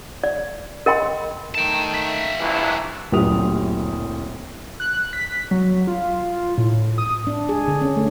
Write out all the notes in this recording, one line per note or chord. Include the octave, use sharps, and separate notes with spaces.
D5
A#4 D#5 G5 B5 C6
D#3 A3 G5 A5
A#3 E5
A#1 G2 E3
D1 F#2 A#2 G4 D#6 F7
F#6
B6
F#3
F4
A2
D#6
D4
G#4
D3
C#4
A3